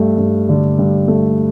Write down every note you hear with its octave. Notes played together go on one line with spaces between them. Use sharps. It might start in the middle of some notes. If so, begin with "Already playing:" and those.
Already playing: G2 A3
G2
D3
G2
A3